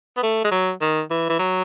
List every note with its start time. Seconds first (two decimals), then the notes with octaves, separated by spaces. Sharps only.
0.17 B3
0.23 A3
0.44 G#3
0.51 F#3
0.81 D#3
1.10 E3
1.29 E3
1.39 F#3